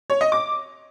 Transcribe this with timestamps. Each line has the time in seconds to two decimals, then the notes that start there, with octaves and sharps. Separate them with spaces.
0.10 C#5
0.21 D#5
0.32 D6